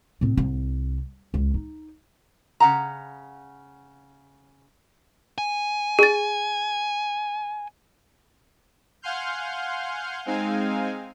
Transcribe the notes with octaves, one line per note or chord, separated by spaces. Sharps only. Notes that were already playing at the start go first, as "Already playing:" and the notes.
A2 C4
C2
C#2
D#4
C#3 F#5 A#5
G#5
G#4 A6
F5 F#5 G#5 C6 F6 G6
G#3 C4 D#4 F5 G#5